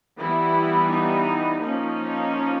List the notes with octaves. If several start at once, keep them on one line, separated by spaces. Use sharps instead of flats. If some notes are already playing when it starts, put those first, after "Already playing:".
E3 G3 B3 E4
D#4
F3 A#3 C#4 D#4